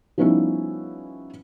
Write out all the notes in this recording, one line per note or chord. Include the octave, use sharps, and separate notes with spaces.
F3 G3 B3 C#4 D#4 E4